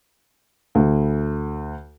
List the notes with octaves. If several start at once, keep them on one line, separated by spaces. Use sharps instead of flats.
D2